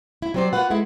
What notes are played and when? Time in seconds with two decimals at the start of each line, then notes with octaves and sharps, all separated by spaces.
0.22 E4
0.34 F#3 G3 C4 G#4 C5 D5
0.53 A#3 F4 F#4 B4 F#5
0.70 G#3 E4 A4